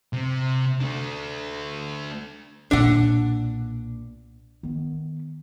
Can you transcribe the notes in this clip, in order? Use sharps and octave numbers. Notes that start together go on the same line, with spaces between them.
C3
A3 D4
B1 A#2 D4 F#5
D#3 B3